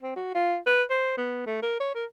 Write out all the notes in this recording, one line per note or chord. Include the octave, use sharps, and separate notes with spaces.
C4
F#4
F4
B4
C5
B3
A3
A#4
C#5
A#4